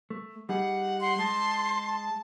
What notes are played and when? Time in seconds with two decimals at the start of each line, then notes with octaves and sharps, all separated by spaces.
0.10 A3
0.49 G3 D#4 G#4 F#5
1.01 F#5 C6
1.19 G#3 A5